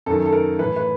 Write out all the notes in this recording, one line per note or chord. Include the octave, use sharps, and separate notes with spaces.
F#2 D#3 A4
A4
A#4
A2 E3 B4
B4